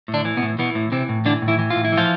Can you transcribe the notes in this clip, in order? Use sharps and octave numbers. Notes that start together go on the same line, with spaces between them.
A2
D3 D4
E3
B2 B3
A2
B2 E3 B3
A2
C3 E3 C4
A2
D3 E3 D4
A2
E3 E4
E3
F4
A2
E4
E3
F3 F4